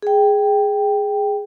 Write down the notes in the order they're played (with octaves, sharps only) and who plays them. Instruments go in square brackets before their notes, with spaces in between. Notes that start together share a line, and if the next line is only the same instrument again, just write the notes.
[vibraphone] G#4 G5